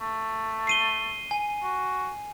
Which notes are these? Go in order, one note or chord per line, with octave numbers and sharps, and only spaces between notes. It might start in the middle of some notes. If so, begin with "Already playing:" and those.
A3
C7 D#7 G7
G#5
F#4